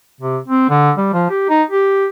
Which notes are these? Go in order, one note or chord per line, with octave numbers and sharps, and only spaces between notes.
C3
C4
D3
G3
F3
G4
D#4
G4